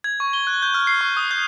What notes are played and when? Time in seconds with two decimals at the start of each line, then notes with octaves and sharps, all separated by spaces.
0.04 G#6
0.20 C#6
0.33 G7
0.47 F#6
0.62 G6
0.74 F6
0.87 C7
1.01 C#6
1.17 D#6
1.31 G6